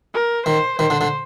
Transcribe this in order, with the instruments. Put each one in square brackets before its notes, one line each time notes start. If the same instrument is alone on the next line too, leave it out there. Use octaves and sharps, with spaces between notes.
[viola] A#4
[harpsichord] D#3 [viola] C5
[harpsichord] D#3 [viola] C5
[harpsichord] D3
D3